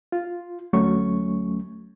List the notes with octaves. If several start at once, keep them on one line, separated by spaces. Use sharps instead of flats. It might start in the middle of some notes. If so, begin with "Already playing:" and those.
F4
D2 F#3 A3 C#4 C#6